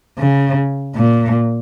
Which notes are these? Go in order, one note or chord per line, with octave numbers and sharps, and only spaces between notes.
C#3
A#2